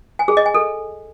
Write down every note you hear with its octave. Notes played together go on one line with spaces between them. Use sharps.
G#5
G#4
D#5
G#5
A4